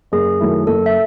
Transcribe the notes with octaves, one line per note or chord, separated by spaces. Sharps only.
F#1 G#4
F#2 D#3 A3 E4
F#1 A4
E5